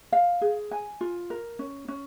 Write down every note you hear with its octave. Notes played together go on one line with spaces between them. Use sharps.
F5
G#4
G#5
F4
A#4
C#4
C#4